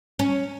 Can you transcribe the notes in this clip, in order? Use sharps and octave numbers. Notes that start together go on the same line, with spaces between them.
C#4